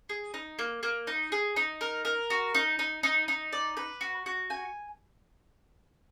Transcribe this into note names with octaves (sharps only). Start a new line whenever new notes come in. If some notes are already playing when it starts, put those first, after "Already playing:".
G#4
D#4
A#3
A#3
D#4
G#4
D#4
A#4
A#4
F#4
D#4
D#4
D#4
D#4
D5
B4
F#4
F#4
G#5